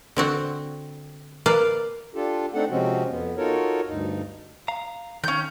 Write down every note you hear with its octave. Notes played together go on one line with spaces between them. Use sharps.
D3 C4 F#4
A#3 B4 D5 F5
D4 F4 G4 A4
A3 C4 D4 D#4 A4 F#5
C3 F3 G#3 C4 C#4 F#4
F2 B3
D#4 F4 F#4 A4 A#4 C#5
D2 G2 D#4
F5 A#5
D#3 C#4 G6